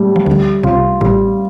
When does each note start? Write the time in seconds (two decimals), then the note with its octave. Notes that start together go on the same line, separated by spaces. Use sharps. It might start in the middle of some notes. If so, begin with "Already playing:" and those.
Already playing: A2 G3
0.16 F3
0.26 D2 D3 G3
0.63 C2 C3 F4
1.01 A1 A2 G3